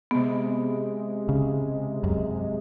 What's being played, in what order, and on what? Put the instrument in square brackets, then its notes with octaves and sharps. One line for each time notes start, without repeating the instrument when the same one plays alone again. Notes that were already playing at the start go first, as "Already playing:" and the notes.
[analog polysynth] C3 G#3 [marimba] B3
[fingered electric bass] C#3
F#2